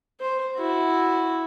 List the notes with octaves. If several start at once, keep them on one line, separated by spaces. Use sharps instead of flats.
C5
E4 F#4